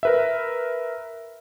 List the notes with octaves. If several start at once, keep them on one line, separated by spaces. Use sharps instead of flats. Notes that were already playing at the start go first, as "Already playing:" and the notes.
A#4 B4 E5